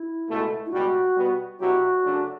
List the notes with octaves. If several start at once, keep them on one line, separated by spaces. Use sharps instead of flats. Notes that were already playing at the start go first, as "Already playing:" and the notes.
Already playing: E4
C#2 B2 A3
E4
C#2 B2 G3 F#4
B2 G3 B3
B2 F#3 C#4 E4 F#4 G4
C#3 F#3 A3 D4